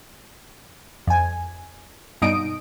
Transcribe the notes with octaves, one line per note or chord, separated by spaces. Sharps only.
F2 G#5
G2 B2 D#4 D#6 D7